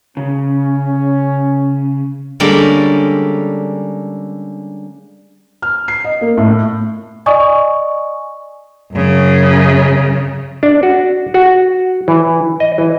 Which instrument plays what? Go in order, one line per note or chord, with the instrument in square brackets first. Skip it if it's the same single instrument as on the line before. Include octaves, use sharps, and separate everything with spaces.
[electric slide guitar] C#3 [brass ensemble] C#4
[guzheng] D3 G3 G#3 A#3 C#4 D4
[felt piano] F6
C7
D#5
A#3
A2
[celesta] D5 D#5 G#5 C#6 D#6
[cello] F#2 C#3
[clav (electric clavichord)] D4
F#4
F#4
E3
D#5
E3